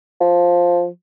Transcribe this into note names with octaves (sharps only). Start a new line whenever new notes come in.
F3